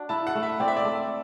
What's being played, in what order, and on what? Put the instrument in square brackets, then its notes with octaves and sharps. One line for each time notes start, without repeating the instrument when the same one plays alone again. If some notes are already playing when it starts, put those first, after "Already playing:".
Already playing: [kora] D4 F#4
[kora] E4 [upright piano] A5
[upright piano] F#5
[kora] A3
[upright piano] E5
[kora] C4 [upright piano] D5
[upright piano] E5
D5
[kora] A3